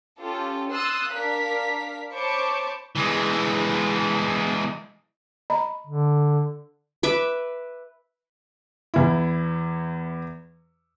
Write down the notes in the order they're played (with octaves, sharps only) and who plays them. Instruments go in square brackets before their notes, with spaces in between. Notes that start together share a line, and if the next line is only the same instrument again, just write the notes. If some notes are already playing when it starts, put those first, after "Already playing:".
[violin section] C#4 F4 G4 A4
C6 D#6 E6 F#6 A6
D4 A#4 F5 B6
C5 C#5 A5 B5 C#6 D6
[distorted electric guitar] E3 G#3
[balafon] D#5 A#5 B5
[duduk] D3
[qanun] B4 E5 D6
[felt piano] E2 E4